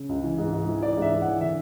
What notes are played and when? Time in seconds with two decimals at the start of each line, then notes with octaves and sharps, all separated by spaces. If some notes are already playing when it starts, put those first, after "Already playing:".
Already playing: C#3
0.09 C#2
0.23 E3
0.38 G#2
0.53 G#2
0.68 E3
0.82 E3 D5
0.97 G#2
1.02 E5
1.11 G#2
1.21 F#5
1.27 E3
1.41 D3 E5